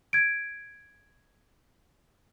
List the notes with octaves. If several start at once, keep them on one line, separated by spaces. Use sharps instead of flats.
G#6 D7